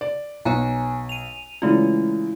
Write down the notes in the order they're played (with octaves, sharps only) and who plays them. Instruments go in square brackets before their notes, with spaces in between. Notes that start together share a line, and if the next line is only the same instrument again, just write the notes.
[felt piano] D5
[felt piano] B1 [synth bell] C#5 G#5 A#5
[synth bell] D#7 F7
[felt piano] C#3 E3 [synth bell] G#3 A3 F4